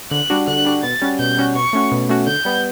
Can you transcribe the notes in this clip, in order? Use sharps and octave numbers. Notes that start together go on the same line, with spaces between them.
D3 F#6
G3 D4 F#4
D3 F#6
G3 D4 F#4
B2 A6
G3 C#4 F#4
B2 G6
G3 C#4 F#4
B2 C#6
A3 C#4 F#4
B2
A3 C#4 F#4
D3 G6
G3 B3